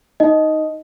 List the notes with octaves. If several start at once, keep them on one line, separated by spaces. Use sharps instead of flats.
D#4 D#5